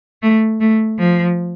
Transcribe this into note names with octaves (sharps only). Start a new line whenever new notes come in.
A3
A3
F3